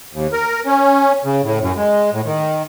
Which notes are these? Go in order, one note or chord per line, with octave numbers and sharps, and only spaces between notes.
D#2
A#4
C#4
C#3
A2
F#2
G#3
A2
D#3